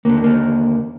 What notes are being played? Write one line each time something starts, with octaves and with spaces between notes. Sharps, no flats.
D#2 D3 A#3
A#3